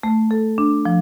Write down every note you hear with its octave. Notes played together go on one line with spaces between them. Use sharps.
A3
A4
D4
F3